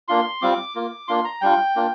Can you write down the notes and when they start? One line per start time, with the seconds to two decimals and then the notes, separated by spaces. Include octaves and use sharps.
0.08 A#3 D4 F4 C6
0.42 G3 C4 F4 D6
0.75 A#3 F4
1.08 A#3 D4 F4 C6
1.25 A#5
1.41 G3 D4 F4 G5
1.76 A#3 D4 F4